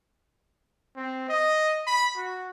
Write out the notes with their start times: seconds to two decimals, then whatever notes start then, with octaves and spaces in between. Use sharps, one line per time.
0.96 C4
1.29 D#5
1.87 B5
2.16 F#4